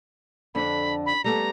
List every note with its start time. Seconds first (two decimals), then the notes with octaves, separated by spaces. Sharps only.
0.55 F2 D3 D4 B5
1.06 B5
1.24 G3 A3 B3 A#5